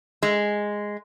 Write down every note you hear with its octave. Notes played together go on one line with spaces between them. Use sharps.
G#3